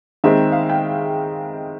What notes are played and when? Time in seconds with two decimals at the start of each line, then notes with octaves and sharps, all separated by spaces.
0.24 D#3 G#3 C4 E5
0.52 F5
0.70 G5